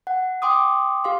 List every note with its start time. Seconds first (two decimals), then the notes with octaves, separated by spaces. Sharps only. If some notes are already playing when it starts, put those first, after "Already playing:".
0.07 F#5
0.42 G5 C6 D6 D#6
1.04 G4 F5 C6